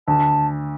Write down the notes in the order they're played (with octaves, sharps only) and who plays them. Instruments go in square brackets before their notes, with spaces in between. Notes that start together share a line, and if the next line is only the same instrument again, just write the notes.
[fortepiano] D2 [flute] A5